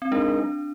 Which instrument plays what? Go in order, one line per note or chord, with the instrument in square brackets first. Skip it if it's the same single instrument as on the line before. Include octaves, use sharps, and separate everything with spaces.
[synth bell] C4
[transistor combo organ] G#3 D#4 A#4 [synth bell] D4